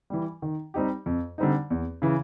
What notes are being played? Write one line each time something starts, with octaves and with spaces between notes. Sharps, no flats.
E3 G3
D#3
G3 C4 D#4 G4
F2
D3 G3 C4 D#4
E2
C#3 E3